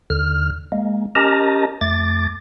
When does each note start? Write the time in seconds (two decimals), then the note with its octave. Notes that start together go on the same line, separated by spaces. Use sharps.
0.10 D#2 D3 F6
0.72 G#3 A#3
1.15 C#4 G4 A#4 D#5 A5 A#5
1.81 F2 A3 D6 A6